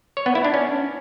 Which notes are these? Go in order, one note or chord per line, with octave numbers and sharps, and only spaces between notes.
C#5
B3
E4
D4
C#4